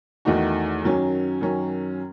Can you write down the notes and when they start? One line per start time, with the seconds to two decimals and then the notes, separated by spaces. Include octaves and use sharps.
0.25 E2 D#3 A3 D#4 F#4
0.83 F#2 D#3 F#3 C#4
1.41 F#2 D#3 F#3 C#4